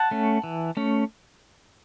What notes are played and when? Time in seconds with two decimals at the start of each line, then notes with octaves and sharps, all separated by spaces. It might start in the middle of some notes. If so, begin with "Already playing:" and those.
Already playing: F#5 A5
0.11 A3 C#4
0.44 E3
0.77 A3 C#4